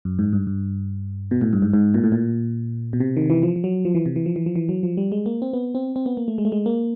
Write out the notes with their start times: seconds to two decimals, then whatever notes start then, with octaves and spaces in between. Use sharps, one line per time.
0.05 F#2
0.19 G#2
0.33 G2
0.47 G2
1.31 B2
1.41 A2
1.53 G2
1.62 G#2
1.73 G#2
1.94 A#2
2.04 A2
2.12 A#2
2.93 B2
3.00 C3
3.17 D#3
3.30 E3
3.43 F3
3.56 F3
3.64 F#3
3.85 F3
3.95 E3
4.06 C3
4.16 E3
4.26 F3
4.36 E3
4.46 F3
4.56 E3
4.69 F#3
4.83 F3
4.97 G3
5.12 G#3
5.26 A#3
5.42 C4
5.53 B3
5.75 C4
5.96 C4
6.06 B3
6.17 A#3
6.28 A3
6.38 G#3
6.45 A3
6.52 G#3
6.66 A#3